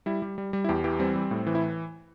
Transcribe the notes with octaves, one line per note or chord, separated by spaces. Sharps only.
G3 E4
G3
G3
G3
E4
E2 G4
E3 G4
G3 C4
G3
A2
E3
E4